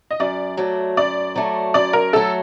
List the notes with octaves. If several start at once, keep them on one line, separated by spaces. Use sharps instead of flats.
D#5
F#2 D5
F#3 A3
F#2 D5
F#3 A3
F#2 D5
A#4
F#3 A3 A4